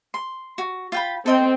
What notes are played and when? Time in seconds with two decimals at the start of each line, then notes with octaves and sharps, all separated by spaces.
0.14 C6
0.58 F#4
0.92 F4 G5 B5
1.26 C4 A4 D#5 G5